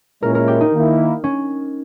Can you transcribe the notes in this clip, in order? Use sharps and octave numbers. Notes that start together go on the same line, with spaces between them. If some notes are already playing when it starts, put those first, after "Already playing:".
A#2 G#3 C#4 E4 A#4
A#4
G4
D#4
D#3 A#3 E4
C#4